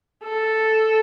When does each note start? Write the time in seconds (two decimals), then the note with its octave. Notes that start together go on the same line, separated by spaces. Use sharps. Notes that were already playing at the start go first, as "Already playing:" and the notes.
0.24 A4